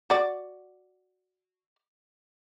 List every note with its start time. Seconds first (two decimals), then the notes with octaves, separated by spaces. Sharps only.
0.10 F#4 D5